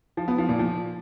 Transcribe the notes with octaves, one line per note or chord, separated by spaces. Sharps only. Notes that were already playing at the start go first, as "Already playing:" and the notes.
F3
B3
F3
A#2
F3